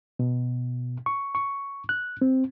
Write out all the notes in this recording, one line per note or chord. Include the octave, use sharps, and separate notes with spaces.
B2
C#6
C#6
F#6
C4